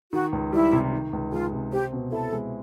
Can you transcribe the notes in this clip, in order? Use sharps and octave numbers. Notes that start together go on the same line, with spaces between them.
D#3 F#4
C#2
G3 E4
C3
D#3
C#2
G#3 F4
C3
C4 G4
B2
E4 A4
G#3